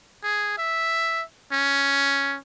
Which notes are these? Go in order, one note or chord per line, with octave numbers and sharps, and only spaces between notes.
G#4
E5
C#4